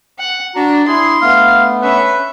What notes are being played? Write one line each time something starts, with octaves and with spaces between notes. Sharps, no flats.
F#5
D4 F#4 A#5
E4 G#4 C6
A3 B3 F5
C#4 B4 E5